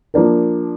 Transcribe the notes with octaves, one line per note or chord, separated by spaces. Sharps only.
F3 A#3 D4 A#4